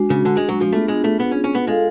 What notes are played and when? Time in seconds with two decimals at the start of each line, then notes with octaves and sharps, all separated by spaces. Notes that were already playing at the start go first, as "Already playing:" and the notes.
Already playing: G#3 D4 F#4
0.10 C#3
0.25 D3
0.37 G#3
0.49 F#3
0.61 F3
0.72 A3 B3 D4 F4 G#4
0.88 G#3
1.04 A3
1.20 B3
1.31 C#4
1.44 C#4
1.55 B3
1.67 G#3 F4 A4 F5